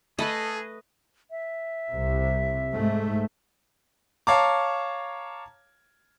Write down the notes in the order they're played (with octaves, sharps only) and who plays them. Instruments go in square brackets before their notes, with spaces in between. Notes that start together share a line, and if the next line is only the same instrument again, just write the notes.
[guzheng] A3 A5 B5 [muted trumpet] G#4 [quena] A4 [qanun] B4 D#5
[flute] E5
[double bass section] C2 C3
G#2 A3
[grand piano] C#5 F5 A5 A#5 D6